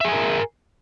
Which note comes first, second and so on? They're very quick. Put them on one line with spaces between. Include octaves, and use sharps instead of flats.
E5 G#4 G#5 A#4